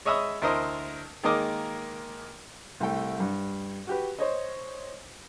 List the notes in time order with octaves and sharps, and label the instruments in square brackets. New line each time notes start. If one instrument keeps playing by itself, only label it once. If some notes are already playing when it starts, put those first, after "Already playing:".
[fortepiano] G#3 C#5 D#5 E5 B5 D#6
D2 E4 A#4 C5 D#5
D#3 G#3 A#3 A#4 D#5 D6
C2 A3 G5
G2
F#4 G4 B4
C5 C#5 D#5